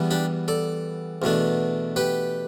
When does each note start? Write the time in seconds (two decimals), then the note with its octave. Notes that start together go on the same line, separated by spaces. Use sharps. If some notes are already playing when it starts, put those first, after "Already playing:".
Already playing: E2 E3 G3 B3
0.11 D4 G4
0.48 A4 D5
1.22 E2 B2 A3 D4
1.96 G4 B4